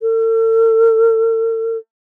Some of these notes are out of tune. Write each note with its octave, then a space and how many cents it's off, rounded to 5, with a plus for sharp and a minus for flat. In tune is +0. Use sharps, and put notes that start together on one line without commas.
A4 +45